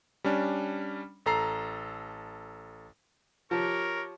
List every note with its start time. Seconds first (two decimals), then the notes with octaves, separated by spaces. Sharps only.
0.24 G3 C#4 D4
1.26 A1 A4 A#5 C7
3.51 F3 G4 A#4 C#5